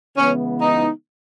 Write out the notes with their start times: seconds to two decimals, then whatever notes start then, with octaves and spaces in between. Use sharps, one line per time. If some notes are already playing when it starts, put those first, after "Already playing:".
0.17 C#3 E3 G#3 B3 C#4 E4
0.61 D#4